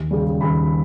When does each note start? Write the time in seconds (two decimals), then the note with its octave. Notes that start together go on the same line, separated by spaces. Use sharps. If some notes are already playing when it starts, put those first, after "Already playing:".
Already playing: D#2
0.11 C#3 G3
0.41 D#2 B5